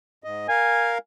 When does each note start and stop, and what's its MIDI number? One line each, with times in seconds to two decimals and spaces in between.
0.24 0.47 44
0.24 0.47 75
0.48 0.98 70
0.48 0.98 77
0.48 0.97 80